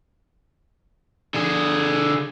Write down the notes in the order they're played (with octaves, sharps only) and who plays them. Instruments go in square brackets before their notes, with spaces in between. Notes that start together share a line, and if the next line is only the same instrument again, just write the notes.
[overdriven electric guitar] D3 G#4